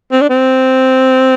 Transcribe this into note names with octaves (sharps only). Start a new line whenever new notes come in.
C4
D4
C4